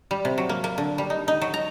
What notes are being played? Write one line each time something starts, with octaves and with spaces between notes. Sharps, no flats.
G3
C3
F#3
A#3
A#3
D3
G3
D#4
D#4
F#3
A#5